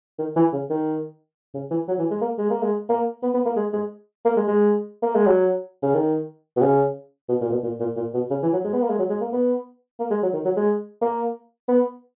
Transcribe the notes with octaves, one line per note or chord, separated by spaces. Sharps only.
D#3
E3
C#3
D#3
C#3
E3
F#3
E3
G#3
A#3
G#3
A#3
G#3
A#3
B3
B3
A#3
G#3
G#3
A#3
G#3
G#3
A#3
G#3
F#3
C#3
D#3
B2
C#3
B2
A#2
B2
A#2
A#2
A#2
B2
C#3
E3
F#3
G#3
B3
A#3
G#3
F#3
G#3
A#3
B3
A#3
G#3
F#3
D#3
F#3
G#3
A#3
B3